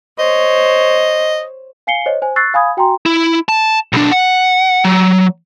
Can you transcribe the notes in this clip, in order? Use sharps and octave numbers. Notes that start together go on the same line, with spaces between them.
C5 C#5 D#5
F5 G#5 C7 C#7 G7
C5 C#5 D#5
C5 G#5
C#6 E6 F#6 A6 C7
F5 G#5 B5 D#6 G#6
F#4 G5 G#5 A#5 C6
E4
A5
B1 D4
F#5
F#3